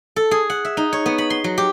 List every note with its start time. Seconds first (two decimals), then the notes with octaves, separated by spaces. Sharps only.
0.16 A4
0.31 G#4
0.50 F#5
0.65 E5
0.77 D#4
0.93 C#5
1.06 B3
1.18 B5
1.30 C6
1.44 F#3
1.58 G4